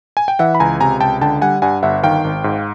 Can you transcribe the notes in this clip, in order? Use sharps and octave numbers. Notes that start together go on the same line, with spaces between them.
G#5
G5
E3 E5 F#5
B5
C#2 G#5 A#5
C3 G#5 A#5
C#2 G5 A5
D3 G5 A5
G3 F#5 G#5
G2 F#5 G#5
G1 E5 F#5
D#3 F5 G5
G#1
G#2